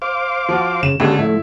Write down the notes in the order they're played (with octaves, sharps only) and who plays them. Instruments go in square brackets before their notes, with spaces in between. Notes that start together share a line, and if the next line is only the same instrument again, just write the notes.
[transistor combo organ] C5 F5 D6
[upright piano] F3 F#4
[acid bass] C#3 [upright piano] E7
[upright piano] C#2 D3 [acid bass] G4 [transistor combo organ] A4
[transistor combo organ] A2 F3 [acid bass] A3 [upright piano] E4